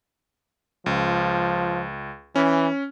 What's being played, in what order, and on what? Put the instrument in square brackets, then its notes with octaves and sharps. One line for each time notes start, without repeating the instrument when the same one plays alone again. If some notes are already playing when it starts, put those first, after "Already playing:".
[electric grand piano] C#2 [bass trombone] F3
[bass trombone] E3 [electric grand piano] C#4